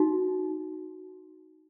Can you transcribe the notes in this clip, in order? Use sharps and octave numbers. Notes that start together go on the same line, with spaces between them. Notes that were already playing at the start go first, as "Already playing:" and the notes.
Already playing: D#4 F#4